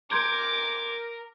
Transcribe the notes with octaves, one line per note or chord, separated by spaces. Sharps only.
A#4 C6 D6 G6 G#6